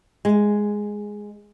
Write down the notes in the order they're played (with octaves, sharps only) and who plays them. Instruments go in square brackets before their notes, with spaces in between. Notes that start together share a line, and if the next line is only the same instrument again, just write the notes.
[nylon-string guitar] G#3